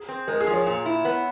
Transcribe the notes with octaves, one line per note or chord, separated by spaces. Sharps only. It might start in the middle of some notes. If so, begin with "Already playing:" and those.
Already playing: G#4
C4
G#3 A#4
G#4
F3
C#5
A#2
E4
B3